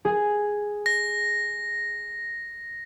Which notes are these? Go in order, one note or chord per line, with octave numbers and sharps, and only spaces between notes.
G#4
A#6